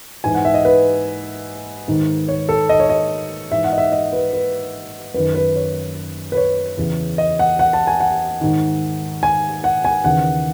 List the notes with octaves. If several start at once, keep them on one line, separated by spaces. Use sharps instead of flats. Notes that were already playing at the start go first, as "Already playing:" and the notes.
G#2 E3 G#5
F#5
E5
D#5
B4
G#2 D#3
C#5
A4
D#5
C#5
D#5
G#2 E3 E5
F#5
D#5
E5
D#5
B4
B4
F#2 D#3 B4
B4
C#5
B4
C#5
E2 C#3 E3
D#5
F#5
F#5
A5
G#5
F#5
G#2 D#3
G#5
F#5
G#5
D#2 C#3 E3 F#5